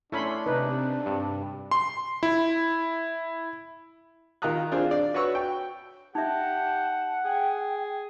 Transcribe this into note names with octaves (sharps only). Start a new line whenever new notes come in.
A3 C#4 D4 E4 B5 C6
C3 D#4 B4
G2
C6
E4
D#3 F4 A#5 D#6 F#6
C4 D4 F4 G#4 C5
D5
F#4 B4 C#5 C#6 E6
G5
D#4 G4 E5 F#5 A5
G#4 G5